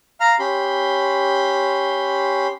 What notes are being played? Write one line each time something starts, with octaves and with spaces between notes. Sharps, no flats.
F5 A#5 F6
C#4 G4 B5 C6